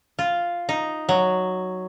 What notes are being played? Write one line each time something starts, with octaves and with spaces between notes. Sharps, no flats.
F4
D#4
F#3